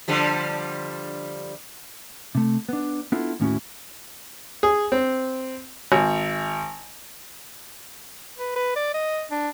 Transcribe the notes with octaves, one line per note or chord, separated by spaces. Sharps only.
D3 F3 G3
C3 A3
B3 D4
B3 D4 E4 F4 A4
D#2 A2 C#4 E4 F#4
G#4
C4
G#1
B4
B4
D5
D#5
D4